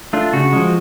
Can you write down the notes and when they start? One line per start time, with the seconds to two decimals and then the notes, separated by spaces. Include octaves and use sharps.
0.13 A3 D4 F4
0.33 C#3 F#4
0.53 F3 G#3